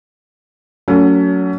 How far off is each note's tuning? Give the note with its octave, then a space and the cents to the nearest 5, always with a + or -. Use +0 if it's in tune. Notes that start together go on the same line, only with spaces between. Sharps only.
F#3 +0 A3 +35 C#4 +30